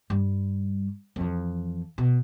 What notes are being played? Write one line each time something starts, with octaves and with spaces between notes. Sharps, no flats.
G2 G3
F2 E3
B2